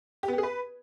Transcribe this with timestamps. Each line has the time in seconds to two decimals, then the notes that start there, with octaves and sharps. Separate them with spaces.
0.23 G4
0.28 B3
0.33 G4
0.38 G#4
0.43 B4